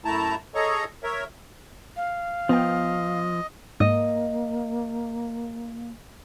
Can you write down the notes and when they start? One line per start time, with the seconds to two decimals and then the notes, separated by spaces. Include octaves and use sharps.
0.05 F#2 A3 E4 A5 A#5
0.55 G#4 A4 C#5 D#5 A#5 C#6
1.03 A#4 C#5 E5
1.97 F5
2.49 F3 B3 D#5 G5
3.80 G#2 A#3 D#5